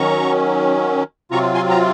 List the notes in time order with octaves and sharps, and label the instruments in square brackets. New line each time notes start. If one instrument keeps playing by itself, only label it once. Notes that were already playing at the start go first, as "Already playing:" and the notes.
Already playing: [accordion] D#3 F#3 C#4 A#5 C#6
C3 F#3 C4 F4 A#5 C#6
G#5 C6
A#5